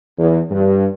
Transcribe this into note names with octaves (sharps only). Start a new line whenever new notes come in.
E2
G2